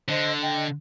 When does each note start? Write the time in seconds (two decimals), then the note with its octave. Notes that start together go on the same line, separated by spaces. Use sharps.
0.09 D3 C5 D#5
0.41 D#5 G5